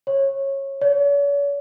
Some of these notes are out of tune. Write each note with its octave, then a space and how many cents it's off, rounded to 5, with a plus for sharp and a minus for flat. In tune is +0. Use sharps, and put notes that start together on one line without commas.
C#5 -20
C#5 +45